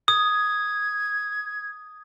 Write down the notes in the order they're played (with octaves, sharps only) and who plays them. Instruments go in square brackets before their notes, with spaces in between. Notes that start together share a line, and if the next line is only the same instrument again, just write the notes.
[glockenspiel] D#6 [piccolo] G#6